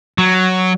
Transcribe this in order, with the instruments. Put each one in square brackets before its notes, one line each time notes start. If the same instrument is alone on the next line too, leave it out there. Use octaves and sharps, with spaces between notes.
[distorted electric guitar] F#3